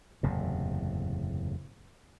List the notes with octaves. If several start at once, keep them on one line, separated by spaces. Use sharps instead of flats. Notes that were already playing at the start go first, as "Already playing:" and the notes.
F#1 E2 A2 C3